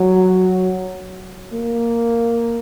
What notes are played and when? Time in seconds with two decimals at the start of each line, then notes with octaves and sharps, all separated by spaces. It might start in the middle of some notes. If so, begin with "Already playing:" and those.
Already playing: F#3
1.53 A#3